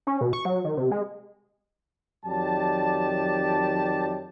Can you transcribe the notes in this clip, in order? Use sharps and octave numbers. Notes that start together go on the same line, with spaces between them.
C#4
B2
C#6
F#3
D#3
C3
G#3
F2 D#3 F#3 G4 D5 A5